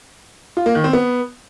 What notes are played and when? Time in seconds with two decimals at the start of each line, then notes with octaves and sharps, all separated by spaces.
0.57 F4
0.66 A#3
0.75 D#3
0.84 C4
0.93 B3